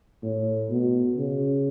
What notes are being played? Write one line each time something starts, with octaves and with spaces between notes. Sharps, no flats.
A2
B2
C#3